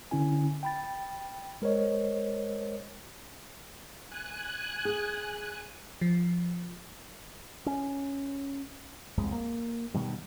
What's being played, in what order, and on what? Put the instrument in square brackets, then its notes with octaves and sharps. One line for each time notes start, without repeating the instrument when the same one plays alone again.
[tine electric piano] D3 C#4 E4 G#5
G5 B5 A6
G#3 A#4 C5 C#5 D#5
[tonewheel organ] G#5 F#6
[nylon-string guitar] G#4
[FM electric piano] F3
[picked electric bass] C#4
F#1 C2 F2 G#3
A#3
B2 D#3 G3